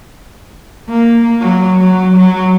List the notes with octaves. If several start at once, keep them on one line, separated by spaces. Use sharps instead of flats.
A#3
F#3
F#3
F#3